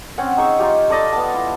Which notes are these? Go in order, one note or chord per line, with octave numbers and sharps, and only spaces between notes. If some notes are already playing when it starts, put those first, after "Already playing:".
C4 C#4 F#5
D#4 G#4 C#6 E6
D#4 F4 G4
A4 D5 D#5 A5
B3 A5
E4 F4